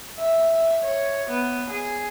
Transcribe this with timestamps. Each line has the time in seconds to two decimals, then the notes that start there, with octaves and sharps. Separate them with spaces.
0.20 E5
0.84 C#5
1.29 B3
1.70 G#4